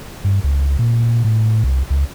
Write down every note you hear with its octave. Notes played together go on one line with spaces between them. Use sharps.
G2
C#2
A#2
A2
C2
C#2